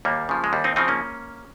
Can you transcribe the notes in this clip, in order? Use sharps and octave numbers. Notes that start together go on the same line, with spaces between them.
D#2 G3 A#3
C#3 F3
G#3
D#2 G3
C4 D#4
C#3 F3 C4 D#4
A#3 C#4